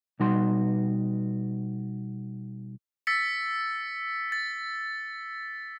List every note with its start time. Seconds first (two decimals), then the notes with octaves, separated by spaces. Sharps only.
0.20 B2 G3 D#4 F#4 B4 C6
3.07 E6 A6 B6 C#7
4.32 A6